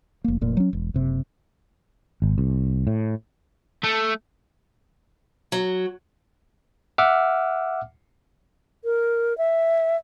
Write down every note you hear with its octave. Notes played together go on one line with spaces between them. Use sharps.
F1 A#3
F1 A#2
F#3 C#4
E1
F#1 C3
G#1
C2
A2
A3
F#3
E5 F#5 D6 E6 F6
A#4
E5